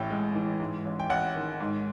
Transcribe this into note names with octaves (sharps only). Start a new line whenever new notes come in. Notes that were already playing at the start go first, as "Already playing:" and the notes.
Already playing: A1 A2 G5
G#3
E3
G#2
A1
G5
A1 F#5
D#3
G#2